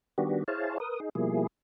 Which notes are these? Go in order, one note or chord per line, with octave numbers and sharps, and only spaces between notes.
D#3 G3 B3 D4 F#4 G4
E4 G#4 C5 C#5 F5 A5
A#4 B4 D#6
D#4 G#4
B2 F3 G3 A#3 E4 G#4